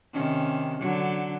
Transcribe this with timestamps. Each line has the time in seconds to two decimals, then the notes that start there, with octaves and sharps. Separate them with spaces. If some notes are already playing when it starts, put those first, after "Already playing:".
0.13 C3 D#3 C#4
0.79 D3 F#3